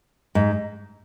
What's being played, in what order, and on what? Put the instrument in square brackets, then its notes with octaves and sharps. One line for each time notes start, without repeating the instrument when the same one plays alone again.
[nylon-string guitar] G#2